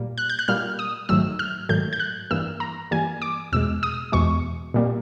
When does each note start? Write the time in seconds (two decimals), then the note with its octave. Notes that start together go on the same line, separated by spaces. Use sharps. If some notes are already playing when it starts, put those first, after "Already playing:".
Already playing: A#2 G3 A#3
0.18 F#6
0.29 G6
0.39 F#6
0.48 A#2 G3 A#3 F6
0.79 D#6
1.09 G#2 D#3 F#3 A3 E6
1.39 F6
1.69 G#2 D#3 F#3 A3 G6
1.93 G6
1.99 F#6
2.31 G2 E3 G3 A#3 E6
2.60 A#5
2.91 G2 E3 G3 A#3 G#5
3.22 D6
3.52 E2 B2 G#3 E6
3.83 D#6
4.12 E2 B2 G#3 C#6
4.74 A#2 G3 A#3